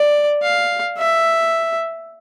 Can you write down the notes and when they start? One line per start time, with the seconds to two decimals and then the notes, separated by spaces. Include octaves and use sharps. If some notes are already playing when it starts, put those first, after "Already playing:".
Already playing: D5
0.43 F5
0.98 E5